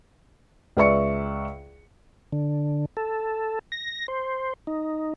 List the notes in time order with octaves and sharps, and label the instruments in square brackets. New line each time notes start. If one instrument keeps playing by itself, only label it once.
[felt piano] C#2 B4 D5 E5 C#6 C#7
[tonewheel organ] D3
A4
A#6
C5
D#4